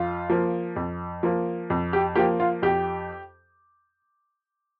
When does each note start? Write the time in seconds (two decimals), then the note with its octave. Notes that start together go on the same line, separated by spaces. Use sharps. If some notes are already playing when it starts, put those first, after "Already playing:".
Already playing: F2 F4
0.30 F3 A#3
0.76 F2
1.23 F3 A#3
1.70 F2
1.93 G4
2.15 F3 A#3 G4
2.40 F4
2.62 F2 G4